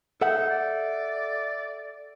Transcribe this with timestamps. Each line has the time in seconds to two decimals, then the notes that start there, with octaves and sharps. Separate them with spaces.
0.21 D#4 A4 E5 F#5
0.49 D5